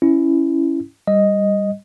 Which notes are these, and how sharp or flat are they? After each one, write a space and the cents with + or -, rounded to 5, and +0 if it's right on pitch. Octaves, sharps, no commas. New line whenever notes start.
C#4 +0 E4 +5
G3 +10 D#5 +0